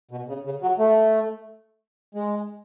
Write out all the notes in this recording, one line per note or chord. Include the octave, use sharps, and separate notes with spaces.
B2
C#3
C#3
F#3
A3
G#3